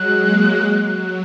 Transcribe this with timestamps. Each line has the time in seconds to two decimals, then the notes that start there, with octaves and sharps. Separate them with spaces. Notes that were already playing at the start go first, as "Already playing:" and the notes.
Already playing: F#3 G#3 F#6
0.21 A#3
0.53 G#3
0.86 F#3